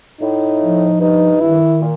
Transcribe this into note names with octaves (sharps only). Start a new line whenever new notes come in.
A2 D#4
F3
G2 D#4
D#3 E4
A#2